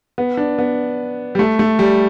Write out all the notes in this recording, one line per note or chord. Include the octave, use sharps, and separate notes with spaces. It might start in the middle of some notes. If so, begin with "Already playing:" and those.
B3
D4
B3
G3
A3
A3
G3